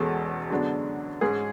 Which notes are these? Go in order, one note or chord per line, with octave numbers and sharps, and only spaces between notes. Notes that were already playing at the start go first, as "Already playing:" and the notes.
Already playing: E1 E2 B2 G#3 C#4 A4
F#2 D3 G#3 B3 D4
G#2 G#3 C#4 G#4